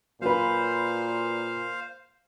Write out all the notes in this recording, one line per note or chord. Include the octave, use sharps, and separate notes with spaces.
A#2 F#3 B4 C5 F5